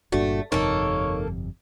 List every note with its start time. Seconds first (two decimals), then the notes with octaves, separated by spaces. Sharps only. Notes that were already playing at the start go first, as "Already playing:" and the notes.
0.12 G1 G2 A#2 A3 D4 F#4
0.52 G1 F2 C3 A#3 D#4 A4 C#5